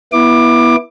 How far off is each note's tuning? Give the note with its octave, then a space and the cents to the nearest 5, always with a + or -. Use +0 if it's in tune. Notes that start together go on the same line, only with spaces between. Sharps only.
B3 -25 E4 +0 D6 +20